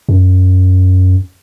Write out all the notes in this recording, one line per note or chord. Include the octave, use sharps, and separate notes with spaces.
F#2